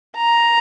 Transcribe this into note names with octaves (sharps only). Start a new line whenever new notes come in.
A#5